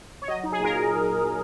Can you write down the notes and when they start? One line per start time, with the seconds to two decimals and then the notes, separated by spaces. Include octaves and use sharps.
0.22 C#5
0.28 F#3 D#5
0.44 D#4
0.52 G#4
0.60 A#2 A#4